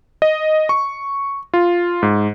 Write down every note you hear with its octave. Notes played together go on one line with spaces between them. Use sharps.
D#5
C#6
F4
G#2